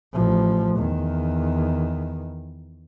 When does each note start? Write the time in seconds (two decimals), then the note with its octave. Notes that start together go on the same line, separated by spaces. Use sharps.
0.13 A1 F3
0.77 E2 D#3